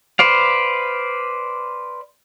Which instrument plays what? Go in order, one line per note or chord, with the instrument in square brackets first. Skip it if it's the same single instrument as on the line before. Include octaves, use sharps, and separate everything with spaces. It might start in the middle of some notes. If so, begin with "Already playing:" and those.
[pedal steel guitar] B4 C5 D5 F5